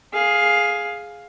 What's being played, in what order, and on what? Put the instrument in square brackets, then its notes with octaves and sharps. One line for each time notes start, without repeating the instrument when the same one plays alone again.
[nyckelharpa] G#4 F5